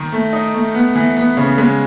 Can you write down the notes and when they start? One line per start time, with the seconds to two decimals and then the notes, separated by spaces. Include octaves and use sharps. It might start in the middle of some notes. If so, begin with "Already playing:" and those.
Already playing: D#3
0.12 A3
0.33 D#4
0.54 A3
0.74 B3
0.96 E3
1.16 B3
1.37 C#3
1.58 G#3